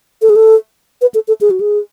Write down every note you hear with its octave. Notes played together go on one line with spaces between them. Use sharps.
A4
G#4
A4
B4
A4
A4
G#4
F#4
G#4